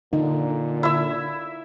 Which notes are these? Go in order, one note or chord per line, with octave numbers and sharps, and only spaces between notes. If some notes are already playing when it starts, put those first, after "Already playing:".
A#2 D3 D#4
E4 E5